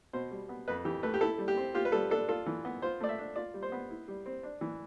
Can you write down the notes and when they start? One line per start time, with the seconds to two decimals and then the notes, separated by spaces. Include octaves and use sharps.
0.13 B2 C5
0.31 G3
0.49 B3
0.68 F2 B4
0.85 E3 G4
1.03 A3 B4
1.14 G4
1.21 E4 A4
1.38 G3
1.48 G4
1.57 C4
1.75 F4 G4
1.85 B4
1.92 G3 A4
2.11 D4 A4
2.29 F4 A4
2.46 E3
2.65 B3
2.82 F4 C5
3.01 A3 D5
3.09 E5
3.18 D4
3.36 F4 D5
3.54 G3
3.62 C5
3.72 B3
3.90 E4
4.08 G3
4.26 C4
4.43 D4
4.61 E3